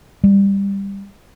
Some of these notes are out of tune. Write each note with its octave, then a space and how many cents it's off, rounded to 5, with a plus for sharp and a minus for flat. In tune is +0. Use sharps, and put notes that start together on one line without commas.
G3 +15